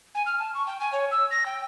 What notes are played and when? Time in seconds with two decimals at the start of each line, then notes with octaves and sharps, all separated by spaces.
0.15 G#5
0.26 F6
0.39 A5
0.55 C#6
0.67 G5
0.80 G#5
0.93 C#5
1.11 E6
1.31 A#6
1.46 G5